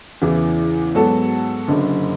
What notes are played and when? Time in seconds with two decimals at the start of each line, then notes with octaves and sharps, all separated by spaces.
0.22 E2 C#3 E3
0.95 G#2 F#3 B3 F#4 A4
1.68 F#1 F#2 D3